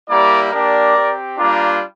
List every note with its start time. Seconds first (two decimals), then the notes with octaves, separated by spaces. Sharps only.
0.09 G3 A#3 E4 G4 A#4 D5
0.51 A#3 D4 G4 A#4 D5
0.96 C4 G4
1.38 G3 A#3 D4 F4 A#4 D5